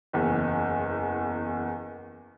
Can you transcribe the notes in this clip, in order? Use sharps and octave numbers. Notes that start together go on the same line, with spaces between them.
F#1 E2